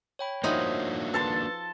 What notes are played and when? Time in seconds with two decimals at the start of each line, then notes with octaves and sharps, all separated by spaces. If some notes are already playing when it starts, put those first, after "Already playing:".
0.19 C#5 G5 B5
0.44 F3 A#3 D4 D#4 F#4 C#5 D#5 E5
1.14 A4 B4 A5 C6